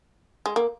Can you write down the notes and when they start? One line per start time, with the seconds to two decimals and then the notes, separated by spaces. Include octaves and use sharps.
0.46 G#3
0.56 A#3